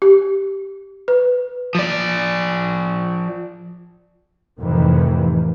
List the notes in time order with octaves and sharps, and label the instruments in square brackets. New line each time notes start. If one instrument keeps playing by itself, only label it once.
[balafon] G4
B4
[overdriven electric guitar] F3 D5
[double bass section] F2 A2 C3 D#3 E3